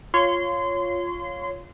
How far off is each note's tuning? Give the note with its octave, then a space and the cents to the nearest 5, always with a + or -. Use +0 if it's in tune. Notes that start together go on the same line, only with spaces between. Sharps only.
F4 +0 C#5 +0 C6 -25